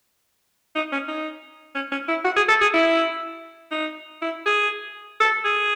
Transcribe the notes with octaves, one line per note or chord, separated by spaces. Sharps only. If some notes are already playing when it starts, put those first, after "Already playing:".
D#4
C#4
D#4
C#4
C#4
E4
F#4
G#4
A4
G#4
E4
D#4
E4
G#4
A4
G#4